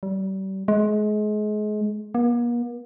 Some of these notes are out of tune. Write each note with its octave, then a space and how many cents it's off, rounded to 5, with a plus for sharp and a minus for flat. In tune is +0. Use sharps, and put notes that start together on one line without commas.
G3 -35
G#3 +30
A#3 +45